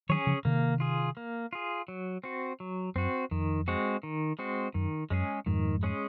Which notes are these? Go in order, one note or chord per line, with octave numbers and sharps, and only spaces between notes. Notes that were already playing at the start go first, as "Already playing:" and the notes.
D#3 F#3 C#4 G#4 C#5
C#3 F3
C3 D#3 A#3
F4 G#4
A#3
F4 G#4
F#3
C4 F#4
F#3
F#2 C4 F#4
F2 D#3
G#3 C4 F#4
D#3
G#3 C4 F#4
F#2 D#3
F#2 G#3 C#4 G#4
F2 G#2 D#3
G#3 C#4 G#4